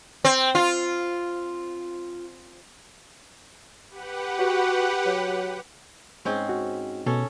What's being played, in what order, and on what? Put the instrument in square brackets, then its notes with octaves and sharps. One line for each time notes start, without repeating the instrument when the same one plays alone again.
[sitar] C4
F4
[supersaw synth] G4 B4 F#5
[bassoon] F#4
F#3
[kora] G#2 C4 C#4
[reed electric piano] F#4
[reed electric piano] B2 [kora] C#4 A4